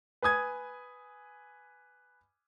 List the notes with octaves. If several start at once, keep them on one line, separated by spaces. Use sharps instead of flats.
B4 G#5 D#6 G#6